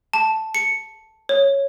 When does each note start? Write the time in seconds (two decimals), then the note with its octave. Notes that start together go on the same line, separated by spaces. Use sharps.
0.13 A5
0.55 C#7
1.29 C#5